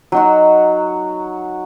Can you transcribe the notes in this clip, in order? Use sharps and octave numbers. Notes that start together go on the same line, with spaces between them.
F#3 D#4 F#4